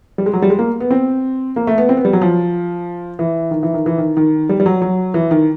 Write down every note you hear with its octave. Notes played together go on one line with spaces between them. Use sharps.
G3
G#3
F#3
G3
G#3
A#3
B3
C4
A#3
A3
B3
C4
B3
G3
F#3
F3
E3
D#3
E3
D#3
E3
D#3
D#3
G3
G3
F#3
F#3
E3
D#3